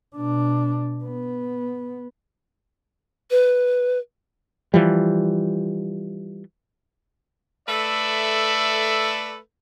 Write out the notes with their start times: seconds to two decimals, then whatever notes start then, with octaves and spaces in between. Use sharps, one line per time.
0.16 B2 D4
1.04 B3
3.31 B4
4.74 E3 F3 G3
7.67 A3 A4 B4 D5 E5